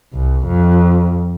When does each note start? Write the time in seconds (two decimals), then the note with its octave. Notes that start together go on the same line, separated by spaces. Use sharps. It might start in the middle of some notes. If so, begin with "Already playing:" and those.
0.14 C2
0.47 F2